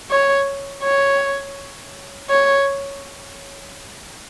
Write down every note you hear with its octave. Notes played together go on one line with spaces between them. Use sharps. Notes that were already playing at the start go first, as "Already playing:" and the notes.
C#5
C#5
C#5